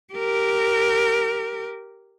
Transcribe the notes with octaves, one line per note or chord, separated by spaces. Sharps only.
G4 A#4